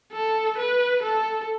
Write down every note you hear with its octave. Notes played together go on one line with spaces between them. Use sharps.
A4
B4
A4